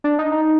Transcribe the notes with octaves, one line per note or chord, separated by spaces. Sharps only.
D4
D#4
D#4